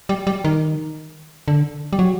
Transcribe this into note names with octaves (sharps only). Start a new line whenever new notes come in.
G3
G3
D#3
D3
G3
F#3